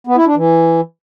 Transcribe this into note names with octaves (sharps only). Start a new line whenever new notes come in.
B3
E4
D4
E3